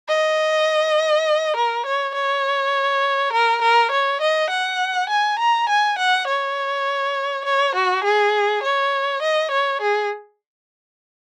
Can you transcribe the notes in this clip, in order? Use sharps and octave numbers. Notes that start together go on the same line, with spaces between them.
D#5
A#4
C#5
C#5
A#4
A#4
C#5
D#5
F#5
G#5
A#5
G#5
F#5
C#5
C#5
F#4
G#4
C#5
D#5
C#5
G#4